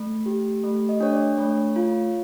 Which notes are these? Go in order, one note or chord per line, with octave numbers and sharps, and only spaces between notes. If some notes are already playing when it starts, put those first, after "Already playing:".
Already playing: A3
G4
A3
D#5
D4 C#5
D5
A3 C#5
F4